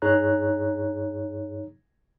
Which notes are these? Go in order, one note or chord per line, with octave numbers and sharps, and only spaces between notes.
G2 D#4 G#4 C#5 A#5 F#6